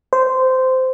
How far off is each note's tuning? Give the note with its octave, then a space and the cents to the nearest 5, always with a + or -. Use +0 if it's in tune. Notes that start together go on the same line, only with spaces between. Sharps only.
C5 -15